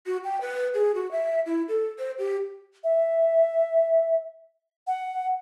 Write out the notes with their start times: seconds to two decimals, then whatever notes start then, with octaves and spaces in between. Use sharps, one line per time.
0.06 F#4
0.24 G5
0.41 B4
0.74 G#4
0.95 F#4
1.11 E5
1.46 E4
1.68 A4
1.99 C5
2.18 G4
2.84 E5
4.87 F#5